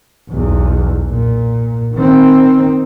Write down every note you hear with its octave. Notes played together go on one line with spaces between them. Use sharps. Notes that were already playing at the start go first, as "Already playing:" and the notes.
B1 E2
A#2
D#3 C4